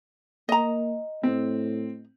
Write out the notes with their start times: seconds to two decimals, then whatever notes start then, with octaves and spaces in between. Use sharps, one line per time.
0.49 A#3 D#5 A#5
1.23 A2 C4